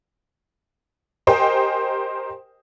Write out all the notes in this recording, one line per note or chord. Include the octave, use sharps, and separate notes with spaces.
G4 A#4 C5 D#5 G5 G#5